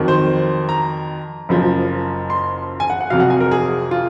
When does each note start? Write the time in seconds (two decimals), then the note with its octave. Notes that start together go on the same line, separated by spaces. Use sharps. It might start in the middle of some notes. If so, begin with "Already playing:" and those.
Already playing: F2 D#3 F#3
0.08 C5
0.69 A#5
1.49 F#1 F#2 F3
2.30 C6
2.80 G#5
2.90 F#5
3.01 F#5
3.10 F2 C3 F#3 F5
3.20 F#5
3.30 G#5
3.40 A#4
3.51 G#4
3.91 F4